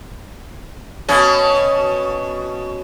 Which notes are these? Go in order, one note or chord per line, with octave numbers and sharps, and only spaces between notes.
B2 C#4